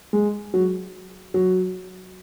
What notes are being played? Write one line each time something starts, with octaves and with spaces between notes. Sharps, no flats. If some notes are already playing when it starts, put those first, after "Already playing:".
G#3
F#3
F#3